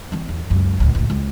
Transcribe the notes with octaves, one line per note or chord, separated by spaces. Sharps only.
E3 C4
E2
C#2 F#2
C#2 A2
C#2 A2
C#2